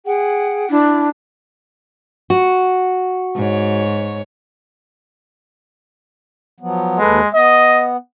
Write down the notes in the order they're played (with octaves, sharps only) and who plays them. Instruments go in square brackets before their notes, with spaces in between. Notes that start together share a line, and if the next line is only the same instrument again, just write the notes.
[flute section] G#4 F#5 G5
[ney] D4 [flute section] E4
[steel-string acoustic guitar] F#4
[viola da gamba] G#2 C#5
[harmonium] F3 F#3 B3
[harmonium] D#2 A4 B4 [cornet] G#3
[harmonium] B3 [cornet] D#5